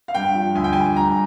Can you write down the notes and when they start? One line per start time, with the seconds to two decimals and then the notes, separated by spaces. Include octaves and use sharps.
0.08 F5
0.14 G2 G5
0.34 F3
0.55 D2 G#5
0.64 G5
0.73 G3 G#5
0.96 G2 A#5